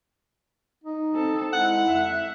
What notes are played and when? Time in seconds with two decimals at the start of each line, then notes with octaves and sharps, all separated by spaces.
0.84 D#4
1.14 C4 A4
1.53 G#3 E4 F#5
1.87 F2 E5